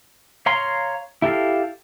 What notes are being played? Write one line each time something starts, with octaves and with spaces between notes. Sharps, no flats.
C#5 F5 A#5 C6
E4 G4 A4 F5